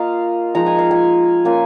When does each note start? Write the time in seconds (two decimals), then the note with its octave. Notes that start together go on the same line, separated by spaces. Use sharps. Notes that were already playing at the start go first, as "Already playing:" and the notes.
Already playing: A#3 F4 D#5 F5
0.55 F3 G#3 D#4 A#5
0.66 G#5
0.79 F5
0.91 G#5
1.45 A#3 C#4 F4 G#5